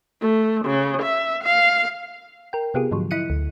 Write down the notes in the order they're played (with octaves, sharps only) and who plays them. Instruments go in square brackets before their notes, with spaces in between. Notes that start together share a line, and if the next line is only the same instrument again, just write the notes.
[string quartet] A3
C#3
E5
F5
[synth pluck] A#4 G5
C3 B3 F4 G4 G#4
G#2 D3 F3 F#3
E4 D#5 F#6 C#7 D#7
D2